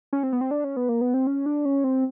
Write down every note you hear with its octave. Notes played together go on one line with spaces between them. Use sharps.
C#4
C4
B3
C4
D4
C#4
B3
A#3
B3
C4
C#4
D4
C#4
C4